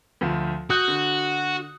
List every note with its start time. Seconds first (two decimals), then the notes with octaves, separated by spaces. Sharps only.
0.21 D2 F3
0.70 F#4 D#6 F#6 G6
0.88 D3